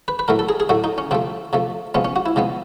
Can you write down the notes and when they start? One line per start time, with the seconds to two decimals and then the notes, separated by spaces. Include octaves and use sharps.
0.08 B4
0.19 B4
0.28 A2 F#3 A3 A#4
0.39 A4
0.49 G#4
0.60 G#4
0.69 A2 F#3 A3 F#4
0.84 D#4
0.98 C#4
1.11 C3 F3 A3 C4
1.53 C3 F3 A3
1.95 C3 F3 G#3 B3 C#4
2.05 C#4
2.16 F#4
2.26 E4
2.36 C3 F3 G#3 B3